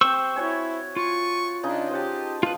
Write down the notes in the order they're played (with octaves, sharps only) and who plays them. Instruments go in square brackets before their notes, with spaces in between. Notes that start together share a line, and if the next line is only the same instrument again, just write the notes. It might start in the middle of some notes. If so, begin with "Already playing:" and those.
[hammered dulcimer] C4 G4 G5 [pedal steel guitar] C5 C#6 E6
[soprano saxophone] E4 [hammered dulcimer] F#4 C#5 G#5
[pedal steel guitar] F4 [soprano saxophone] C#6
[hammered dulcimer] C#3 D#4 D#5 [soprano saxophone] D4
[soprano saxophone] G4 [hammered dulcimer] C5 F#5 A5
[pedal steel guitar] F4 B4 [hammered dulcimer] F5